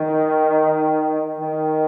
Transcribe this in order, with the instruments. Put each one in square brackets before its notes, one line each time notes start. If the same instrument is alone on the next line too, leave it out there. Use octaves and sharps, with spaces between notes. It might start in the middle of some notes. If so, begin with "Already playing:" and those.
Already playing: [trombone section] D#3
D#3